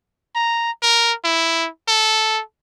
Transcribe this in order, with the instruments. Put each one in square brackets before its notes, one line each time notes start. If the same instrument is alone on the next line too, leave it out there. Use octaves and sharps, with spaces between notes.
[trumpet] A#5
A#4
E4
A4